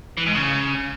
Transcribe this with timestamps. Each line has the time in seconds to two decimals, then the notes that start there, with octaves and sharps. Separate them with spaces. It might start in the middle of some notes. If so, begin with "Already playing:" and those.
0.17 E3
0.26 G#2
0.35 C#3